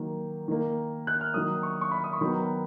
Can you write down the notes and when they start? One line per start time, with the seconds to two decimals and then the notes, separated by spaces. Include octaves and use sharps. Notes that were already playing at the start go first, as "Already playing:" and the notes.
Already playing: D#3 F#3 A#3
0.48 D#3 A#3
1.07 F#6
1.21 F6
1.34 D#3 F#3 A#3 D#6
1.63 C#6
1.81 C#6
1.91 B5
2.04 D#6
2.13 C#6
2.21 D#3 F#3 B3 B5